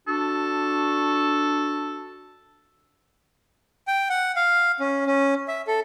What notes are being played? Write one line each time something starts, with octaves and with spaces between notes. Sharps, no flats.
D4 F#4 A4
G5
F#5
F5
C#4
C#4
E5
A4